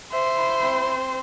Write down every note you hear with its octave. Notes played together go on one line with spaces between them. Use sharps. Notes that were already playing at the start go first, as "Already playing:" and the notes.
C5 E5
E4
C4
C4